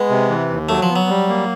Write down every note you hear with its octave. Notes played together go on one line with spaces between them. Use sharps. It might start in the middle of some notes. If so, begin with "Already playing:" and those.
Already playing: G#3 B3
C3
E3
D#2
F#3 A3
F3
B3
F#3
G3
A#3